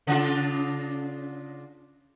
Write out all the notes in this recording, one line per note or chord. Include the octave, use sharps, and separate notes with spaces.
C#3 D4 F4